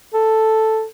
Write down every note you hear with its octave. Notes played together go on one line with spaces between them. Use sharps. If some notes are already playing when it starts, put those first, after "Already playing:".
A4